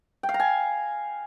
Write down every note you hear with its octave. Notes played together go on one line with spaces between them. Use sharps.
G5
F5
A#5
G#5